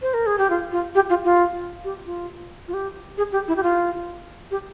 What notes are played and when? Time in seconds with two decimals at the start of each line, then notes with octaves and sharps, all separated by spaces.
0.02 C5
0.14 A#4
0.26 G#4
0.38 G4
0.50 F4
0.72 F4
0.95 G4
1.10 F4
1.24 F4
1.84 G4
2.06 F4
2.68 F4
2.74 G4
3.18 G#4
3.32 G4
3.48 E4
3.57 G4
3.63 F4
4.51 G4